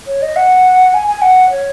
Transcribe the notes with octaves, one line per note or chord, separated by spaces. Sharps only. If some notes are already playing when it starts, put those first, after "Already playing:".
C#5
D#5
F#5
G#5
G#5
F#5
C#5